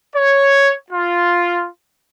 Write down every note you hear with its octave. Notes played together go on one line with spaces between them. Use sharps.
C#5
F4